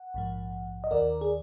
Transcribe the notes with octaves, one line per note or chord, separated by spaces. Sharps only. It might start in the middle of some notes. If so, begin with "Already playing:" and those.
Already playing: F#5
A#1 G#2 F3
D#5
D#2 D#3 A#4 D5
G#4